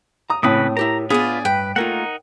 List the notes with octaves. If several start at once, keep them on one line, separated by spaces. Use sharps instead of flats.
A#5 D#6
A2 C#3 A#3 C4 E4 B4 D#6
E4 G4 A#4 A#5
B3 D4 F4 G#4 B4 D5
G2 B4 G5
A3 A#3 D#4 F4 A#4 F#5